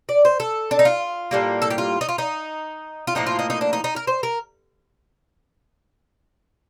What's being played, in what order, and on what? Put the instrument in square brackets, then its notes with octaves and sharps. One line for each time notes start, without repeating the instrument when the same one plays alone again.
[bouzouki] D5
C5
A4
D4
D#4
F4
A2 G3 A#3
A4
G4
F4
D#4
F4
D#4
F4
A2 F3 A#3 D#4
F4
D#4
D#4
D4
D#4
D#4
A#4
C5
A#4